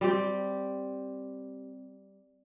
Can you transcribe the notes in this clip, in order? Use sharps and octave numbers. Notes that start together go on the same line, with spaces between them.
G3 C4 G4